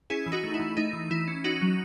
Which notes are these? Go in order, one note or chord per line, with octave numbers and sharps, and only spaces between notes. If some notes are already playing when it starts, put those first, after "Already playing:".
C#4 E4 G#4
E3
D#4 F#4
A3
E4
E3
A3 D#4
E3
E3 E4
C#4
C#4 D#4 F#4
F#3